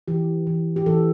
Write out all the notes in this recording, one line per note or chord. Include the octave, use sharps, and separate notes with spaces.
E3 G4
E3
G4
E3 A4